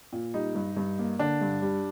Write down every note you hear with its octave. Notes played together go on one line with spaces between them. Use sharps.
A#2
G3 D#4
G2
G2
A#3
D3 D4
G2
G3